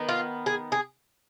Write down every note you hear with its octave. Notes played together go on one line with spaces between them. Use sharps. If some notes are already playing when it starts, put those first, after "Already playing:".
Already playing: D#3 B3
F4
G#4
G#4